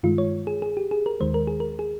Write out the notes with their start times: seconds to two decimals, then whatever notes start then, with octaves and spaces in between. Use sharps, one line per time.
0.03 G2 D#3 G#3 F4
0.18 C#5
0.47 G#4
0.62 G#4
0.77 G4
0.91 G#4
1.06 A#4
1.20 D#2 D#3 G#3 C5
1.34 A#4
1.47 G#4
1.60 A#4
1.79 G#4